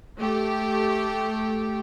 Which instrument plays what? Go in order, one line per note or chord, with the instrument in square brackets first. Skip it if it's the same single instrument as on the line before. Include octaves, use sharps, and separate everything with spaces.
[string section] A3 G4